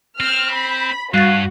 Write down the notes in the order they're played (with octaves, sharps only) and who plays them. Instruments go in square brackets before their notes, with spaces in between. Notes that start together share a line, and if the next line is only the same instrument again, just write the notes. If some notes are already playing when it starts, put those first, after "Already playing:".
[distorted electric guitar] C4 [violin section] F6
[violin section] B5
[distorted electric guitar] G2 [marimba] G3 A6 [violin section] F#4 [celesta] F5 F#6 C7